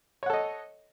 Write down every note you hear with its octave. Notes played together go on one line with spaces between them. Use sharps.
A4 C#5 D#5 F#5